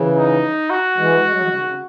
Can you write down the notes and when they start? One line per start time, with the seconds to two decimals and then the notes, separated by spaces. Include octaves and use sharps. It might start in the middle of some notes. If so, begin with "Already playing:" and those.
Already playing: C#3 E3
0.17 D#4
0.70 F#4
0.97 E3 G#3
1.24 G#3
1.33 F#3
1.42 E3 G#3
1.51 C#3
1.58 D#3
1.65 C#3